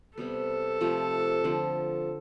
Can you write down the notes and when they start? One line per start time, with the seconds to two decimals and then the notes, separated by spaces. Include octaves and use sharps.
0.18 C3 G3 B3 A4
0.81 C3 F3 A3
1.44 D3 F3 C4